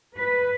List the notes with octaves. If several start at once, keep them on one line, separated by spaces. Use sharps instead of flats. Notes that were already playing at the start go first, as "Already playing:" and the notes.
B4